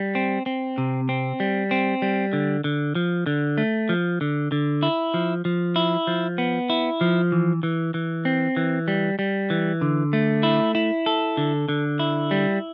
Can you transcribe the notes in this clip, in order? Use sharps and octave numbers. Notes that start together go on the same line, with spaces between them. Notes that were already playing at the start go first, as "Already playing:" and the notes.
Already playing: G3
C4
C4
C3
C4
G3
C4
G3
D3
D3
F3
D3
A3
F3
D3
D3
E4
F3
F3
E4
F3
B3
E4
F3
E3
E3
E3
C4
E3
G3
G3
E3
D3
A3
E4
E4
A4
D3
D3
E4
G3